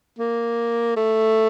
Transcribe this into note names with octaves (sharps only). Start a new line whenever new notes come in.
A#3
A3